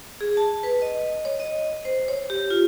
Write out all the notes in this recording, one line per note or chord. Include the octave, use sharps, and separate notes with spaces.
G#4
A5
B4
D#5
C#5
D#5
C5
C#5
G4
F4